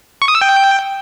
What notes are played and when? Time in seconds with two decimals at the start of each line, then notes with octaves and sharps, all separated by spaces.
0.22 C#6
0.28 D#6
0.35 E6
0.41 G5